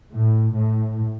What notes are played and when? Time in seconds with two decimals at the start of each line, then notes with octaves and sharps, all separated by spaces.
0.12 A2
0.55 A2